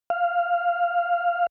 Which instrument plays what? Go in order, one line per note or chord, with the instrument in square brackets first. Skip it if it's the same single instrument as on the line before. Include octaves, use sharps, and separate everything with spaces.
[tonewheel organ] F5